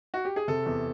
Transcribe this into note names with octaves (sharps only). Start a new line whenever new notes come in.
F#4
G4
G#4
C3 A4
E2